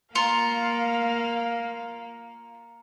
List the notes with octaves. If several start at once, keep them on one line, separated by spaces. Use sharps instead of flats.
A#3 F4 F5 A#5 C#7